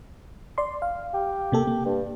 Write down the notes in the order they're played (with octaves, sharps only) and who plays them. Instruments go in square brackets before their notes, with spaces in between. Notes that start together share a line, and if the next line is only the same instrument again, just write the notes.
[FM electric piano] D5 C6
F5
[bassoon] G4
[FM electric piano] C3 A#3 A4
A#3
[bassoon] G2